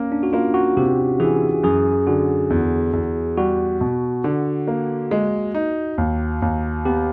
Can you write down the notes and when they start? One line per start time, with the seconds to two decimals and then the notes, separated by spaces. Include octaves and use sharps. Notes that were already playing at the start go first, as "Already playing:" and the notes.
Already playing: A#3 C#4
0.12 D4
0.23 F#4
0.33 A#3 F4
0.54 F#4
0.77 C3 G4
1.20 E3 G#4
1.63 F#2 G#4
2.07 D3 F#4
2.50 E2
2.93 E2
3.37 G3 F#4
3.81 B2
4.24 D3
4.67 A#3
5.11 G#3
5.55 D#4
5.98 D#2
6.42 D#2
6.85 B3 G4